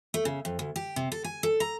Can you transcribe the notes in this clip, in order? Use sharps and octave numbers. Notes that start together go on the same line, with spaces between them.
A3
C#3
F2
D2
G4
C3
A4
G#5
A4
A#5